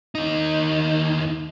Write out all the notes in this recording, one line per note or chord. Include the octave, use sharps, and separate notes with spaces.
D#2 D#4